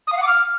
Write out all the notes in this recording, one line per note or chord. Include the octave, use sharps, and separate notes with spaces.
D#6
F5
F#5
D6
F6